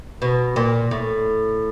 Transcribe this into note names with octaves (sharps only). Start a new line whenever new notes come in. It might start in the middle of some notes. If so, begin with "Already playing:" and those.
B2
A#2
A2